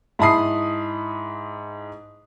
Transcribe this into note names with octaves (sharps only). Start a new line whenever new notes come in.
G#2 E4 A5 B5 D#6 C7